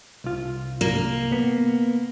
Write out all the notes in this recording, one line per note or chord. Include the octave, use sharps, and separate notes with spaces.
C2 F4
A#3
B3